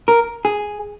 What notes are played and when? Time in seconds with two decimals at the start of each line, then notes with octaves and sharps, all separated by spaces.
0.08 A#4
0.45 G#4